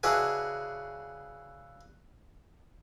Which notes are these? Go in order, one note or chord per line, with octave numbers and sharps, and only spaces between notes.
C#3 D4 E4 F#4 G#4 B4